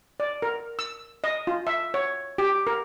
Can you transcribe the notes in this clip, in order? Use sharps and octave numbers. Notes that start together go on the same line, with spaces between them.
D5
A#4
E6
D#5
F4
E5
C#5
G4
A#4